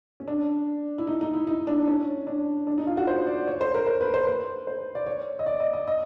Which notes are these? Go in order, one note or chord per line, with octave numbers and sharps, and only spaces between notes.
C#4
D4
E4
D#4
D#4
E4
D#4
D4
C#4
D4
D4
D#4
F4
F#4
C5
D5
C#5
C5
A#4
C5
B4
C5
B4
C5
D5
C#5
D#5
D5
D#5
D#5
D#5